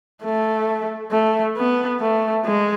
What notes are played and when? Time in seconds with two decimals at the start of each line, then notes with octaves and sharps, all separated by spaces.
0.24 A3
1.12 A3
1.57 B3
2.00 A3
2.45 G#3